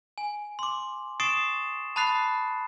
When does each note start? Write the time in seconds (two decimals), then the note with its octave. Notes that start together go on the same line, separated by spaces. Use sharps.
0.18 G#5
0.59 C6 D6
1.20 C#6 D#6 A6 C7 D7 E7
1.96 A5 B5 D#6 F#6 A6 C7